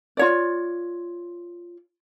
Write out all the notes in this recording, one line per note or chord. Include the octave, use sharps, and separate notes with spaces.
F4 C#5 D5